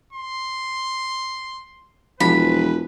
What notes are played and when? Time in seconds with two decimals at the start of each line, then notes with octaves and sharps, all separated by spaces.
0.13 C6
2.20 E1 F3 B4 B5